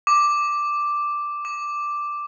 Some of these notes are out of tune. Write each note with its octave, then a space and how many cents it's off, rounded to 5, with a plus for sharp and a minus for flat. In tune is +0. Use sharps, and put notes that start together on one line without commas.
D6 +0
D6 +0